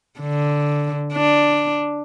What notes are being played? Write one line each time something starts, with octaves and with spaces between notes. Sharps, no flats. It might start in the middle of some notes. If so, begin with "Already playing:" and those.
D3
D4